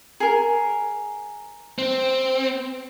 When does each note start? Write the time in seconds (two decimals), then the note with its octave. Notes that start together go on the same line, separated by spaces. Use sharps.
0.20 G#4 A#4
1.78 C4